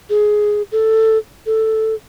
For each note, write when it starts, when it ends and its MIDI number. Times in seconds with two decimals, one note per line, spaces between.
0.10 0.62 68
0.72 1.18 69
1.46 1.95 69